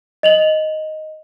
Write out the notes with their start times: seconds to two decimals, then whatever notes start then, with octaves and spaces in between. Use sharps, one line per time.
0.23 D#5 F7 F#7